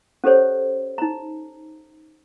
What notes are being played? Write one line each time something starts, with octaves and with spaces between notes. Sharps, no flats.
C#4 G4 A4 C5 C#5
D#4 A#5